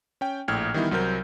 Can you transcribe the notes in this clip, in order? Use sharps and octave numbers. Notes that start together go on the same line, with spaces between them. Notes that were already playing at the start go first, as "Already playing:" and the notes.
C#4 G5
A#1 A2 G5 E6 F6 G#6
D#3 E3 G3 B3 D#4 E4
C2 F#3 C4 A#4 G6